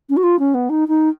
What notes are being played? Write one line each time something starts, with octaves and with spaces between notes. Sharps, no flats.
C#4
F#4
F4
C#4
B3
D#4
D#4